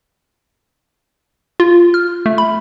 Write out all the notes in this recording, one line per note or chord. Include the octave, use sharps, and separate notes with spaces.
F4
F6
A3
B5